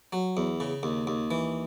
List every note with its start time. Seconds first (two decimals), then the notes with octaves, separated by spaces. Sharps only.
0.13 F#3
0.37 E2
0.60 C#3
0.83 D#2
1.07 D#2
1.31 E3